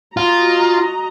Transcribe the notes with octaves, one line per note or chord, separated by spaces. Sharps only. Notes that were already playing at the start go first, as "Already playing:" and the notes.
F4 F#4 D#5 A#5